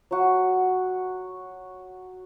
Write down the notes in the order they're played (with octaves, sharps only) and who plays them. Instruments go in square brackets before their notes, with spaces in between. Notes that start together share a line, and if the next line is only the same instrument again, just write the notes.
[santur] F#3 F#4